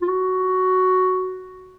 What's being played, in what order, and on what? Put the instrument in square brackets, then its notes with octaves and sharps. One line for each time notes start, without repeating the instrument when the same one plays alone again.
[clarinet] F4
F#4